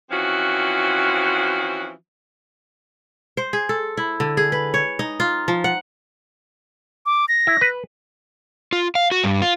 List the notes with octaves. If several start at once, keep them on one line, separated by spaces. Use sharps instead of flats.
E3 F3 C4 C#4 F#4
C5
G#4
A4
E4
D3
G#4
B4
C#5
D#4
F4
F3
F#5
D6
A#6
E4
B4
F4
F5
F#4
G2
F4